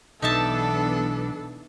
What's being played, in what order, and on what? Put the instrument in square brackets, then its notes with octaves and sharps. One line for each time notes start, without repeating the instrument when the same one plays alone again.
[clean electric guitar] B1 [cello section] E3 B3 D4 [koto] D#4 E5 A5 [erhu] A4